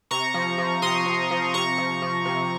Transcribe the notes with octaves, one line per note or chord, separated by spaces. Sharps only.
C3 A#5 C#6
F3
F3
C3 C6 D#6
C3
F3
C3 A#5 C#6
F3
F3
C3